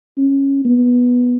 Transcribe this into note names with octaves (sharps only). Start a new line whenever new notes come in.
C#4
B3